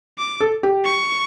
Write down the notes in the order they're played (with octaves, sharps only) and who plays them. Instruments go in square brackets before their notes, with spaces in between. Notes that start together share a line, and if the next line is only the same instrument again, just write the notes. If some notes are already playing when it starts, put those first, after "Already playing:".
[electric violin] D6
[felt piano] A4
G4
[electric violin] C#6